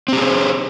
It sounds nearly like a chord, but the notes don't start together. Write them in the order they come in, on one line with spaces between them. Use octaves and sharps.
C4 G4 G#4 C5